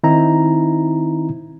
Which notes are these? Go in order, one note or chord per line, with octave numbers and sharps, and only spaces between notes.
D#3 C4 D#4 E4 A#5